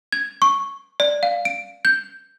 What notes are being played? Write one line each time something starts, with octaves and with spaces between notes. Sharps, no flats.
G#6
C#6
D5
F5
D7
G6